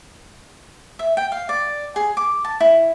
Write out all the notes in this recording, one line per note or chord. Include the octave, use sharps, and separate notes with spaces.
E5
G5
F5
D5
G#4
D6
A5
E4